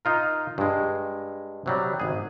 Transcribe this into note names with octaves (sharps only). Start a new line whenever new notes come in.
D#4 F4 A#4
G2 G#3
C3 F#3 G3
G#1 G#4